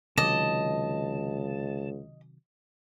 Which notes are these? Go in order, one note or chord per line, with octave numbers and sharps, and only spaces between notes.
C#2 C3 D#3 F#3 D#5 A5